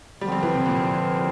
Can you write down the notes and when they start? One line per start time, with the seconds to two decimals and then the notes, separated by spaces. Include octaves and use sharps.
0.21 D3 F3 G3 C4
0.32 G3
0.43 E3
0.55 C3
0.66 A#2